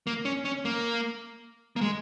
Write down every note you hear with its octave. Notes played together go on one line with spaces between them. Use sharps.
A#3
C#4
C#4
A#3
A#3
G#3